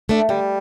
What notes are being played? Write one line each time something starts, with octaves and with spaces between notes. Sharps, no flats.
A3 D4
D3 G3